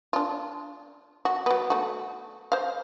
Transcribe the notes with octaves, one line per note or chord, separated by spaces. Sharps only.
D4 F4
F#4
F#3 B3
A3 F#4
C5 F5